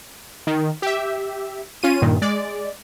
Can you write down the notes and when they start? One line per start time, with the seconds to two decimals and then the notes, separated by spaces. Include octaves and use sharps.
0.47 D#3
0.82 G4 E5
1.83 C#4 F4 D#7
2.02 G2 A#2 D#3
2.22 G#3 D5